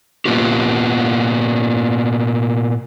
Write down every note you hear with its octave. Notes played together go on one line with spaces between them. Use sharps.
A#2 F#3 A#3 B3 F4 G4